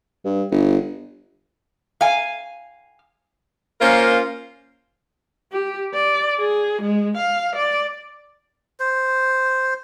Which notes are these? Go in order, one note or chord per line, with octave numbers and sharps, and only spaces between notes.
G2
G1
F5 G#5
A#3 C#4 F4 A#4 C5
G4
D5
G#4
G#3
F5
D5
C5